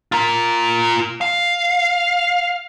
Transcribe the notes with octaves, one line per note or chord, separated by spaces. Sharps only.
F4 A#4
F5